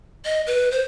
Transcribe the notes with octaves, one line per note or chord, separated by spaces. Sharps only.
D#5
B4
C5